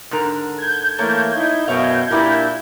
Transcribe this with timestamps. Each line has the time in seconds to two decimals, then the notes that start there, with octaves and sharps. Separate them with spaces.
0.11 G#2 D3 A#4
0.58 G6 G#6
0.99 E3 A3 A#3 C#5 A5
1.35 D#4 E4
1.68 F#2 B2 C#5 E5 F5
2.11 A#2 D4 E4 G4 A#4